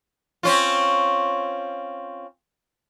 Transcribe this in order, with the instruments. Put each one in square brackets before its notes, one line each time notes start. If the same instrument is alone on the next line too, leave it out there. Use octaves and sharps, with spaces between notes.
[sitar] C4 C#4 F4